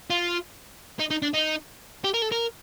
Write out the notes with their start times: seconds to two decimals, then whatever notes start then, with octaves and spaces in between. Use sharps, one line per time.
0.10 F4
0.99 D#4
1.11 D#4
1.22 D4
1.34 D#4
2.04 G4
2.14 A#4
2.22 A4
2.32 A#4